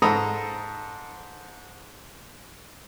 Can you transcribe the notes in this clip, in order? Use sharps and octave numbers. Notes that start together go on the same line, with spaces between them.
G#2 A4 A#5 B5 D#6